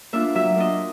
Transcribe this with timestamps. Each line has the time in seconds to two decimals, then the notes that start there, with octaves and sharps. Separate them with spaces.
0.13 A#3 D4 F4 E5
0.35 F#3 E5
0.56 A#3 D4 F4 D#5